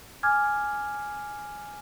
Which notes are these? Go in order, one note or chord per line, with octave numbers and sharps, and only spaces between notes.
G#5 D6 F6 G#6